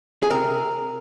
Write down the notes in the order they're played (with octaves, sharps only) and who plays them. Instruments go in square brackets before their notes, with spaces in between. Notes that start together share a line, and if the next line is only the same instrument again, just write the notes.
[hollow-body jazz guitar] G#4
C3 A#4